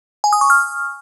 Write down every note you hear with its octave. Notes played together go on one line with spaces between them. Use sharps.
G#5
D#6
C#6
F6